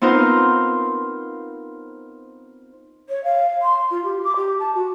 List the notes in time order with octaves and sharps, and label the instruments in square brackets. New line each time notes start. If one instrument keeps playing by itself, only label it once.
[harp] B3 C4 D#4 F4 A#4 C5
[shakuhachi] C#5
F5
C6
F4
G4
D6
G4
A5
F#4